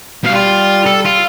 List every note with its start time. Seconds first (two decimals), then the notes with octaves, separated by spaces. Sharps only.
0.24 B2 G3 F5
0.36 F4
0.86 A4
1.05 F4